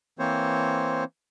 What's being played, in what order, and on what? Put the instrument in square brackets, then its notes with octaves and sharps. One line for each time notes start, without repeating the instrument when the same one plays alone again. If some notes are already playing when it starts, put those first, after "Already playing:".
[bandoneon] E3 A#3 C4 C5 C#5